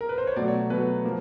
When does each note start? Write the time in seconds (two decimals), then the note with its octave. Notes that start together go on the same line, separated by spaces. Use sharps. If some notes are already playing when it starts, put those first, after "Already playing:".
0.01 A#4
0.09 B4
0.18 C5
0.27 C#5
0.36 B2 F#3 A3 D5
0.48 C#5
0.70 B2 F#3 A3 B4
1.04 F3 A#3